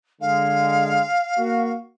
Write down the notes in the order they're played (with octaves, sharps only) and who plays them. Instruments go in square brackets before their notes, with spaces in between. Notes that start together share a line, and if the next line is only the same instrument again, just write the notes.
[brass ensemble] D3 G#3 [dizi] F5
[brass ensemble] A#3 F#4